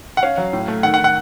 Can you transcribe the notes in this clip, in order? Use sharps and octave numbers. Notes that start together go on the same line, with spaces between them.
F#5
C#4 F5
F#3
A2
A3
D#3 F#5
F#5
D#3
F#5